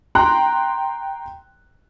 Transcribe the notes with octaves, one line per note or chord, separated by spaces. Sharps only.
G5 A#5 C6 F#6